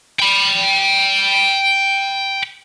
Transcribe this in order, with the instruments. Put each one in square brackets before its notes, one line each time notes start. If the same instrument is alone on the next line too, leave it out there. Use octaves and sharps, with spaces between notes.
[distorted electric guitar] G5 B5